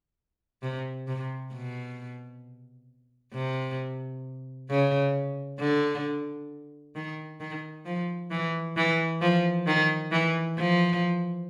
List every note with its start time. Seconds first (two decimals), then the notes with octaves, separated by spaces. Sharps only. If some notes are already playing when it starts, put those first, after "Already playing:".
0.63 C3
1.08 C3
1.53 B2
3.34 C3
4.70 C#3
5.60 D3
6.96 D#3
7.40 D#3
7.86 F3
8.31 E3
8.77 E3
9.22 F3
9.67 D#3
10.12 E3
10.57 F3